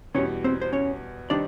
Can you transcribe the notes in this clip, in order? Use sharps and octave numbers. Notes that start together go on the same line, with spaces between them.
E2 B2 G3 C#4 C#5
C4 C5
C5
C#4 C#5
D#3 G3 C4 D4 D#4 D5